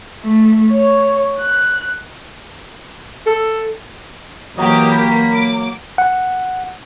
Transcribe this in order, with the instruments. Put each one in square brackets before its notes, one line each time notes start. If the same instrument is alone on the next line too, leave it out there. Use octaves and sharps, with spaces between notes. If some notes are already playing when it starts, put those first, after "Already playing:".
[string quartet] A3
C#5
F#6
[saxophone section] A4
[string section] E3 G4 A#4 [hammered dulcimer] F#3 [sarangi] A#3 [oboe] D#5
[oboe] B5
[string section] D6
[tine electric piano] F#5